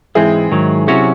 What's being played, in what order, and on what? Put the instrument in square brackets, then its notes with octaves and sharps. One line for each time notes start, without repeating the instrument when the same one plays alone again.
[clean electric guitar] G#2 E3 G#3 C4 [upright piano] E4 G#4
[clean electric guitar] G#2 D#3 F#3
[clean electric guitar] C3 F#3 C#4 F#4 [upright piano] E4 G#4